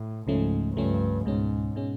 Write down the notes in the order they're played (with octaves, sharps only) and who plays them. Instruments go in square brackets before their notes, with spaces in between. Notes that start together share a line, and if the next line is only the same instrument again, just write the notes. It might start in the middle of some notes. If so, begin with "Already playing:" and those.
Already playing: [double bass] A2
[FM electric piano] C#2 C#3 F3 A3 C#4 [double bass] G#2
[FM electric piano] C#2 C#3 F3 A3 C#4 [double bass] G2
[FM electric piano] C#2 B2 G#3 C#4 [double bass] G#2
[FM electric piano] B2 G#3 C#4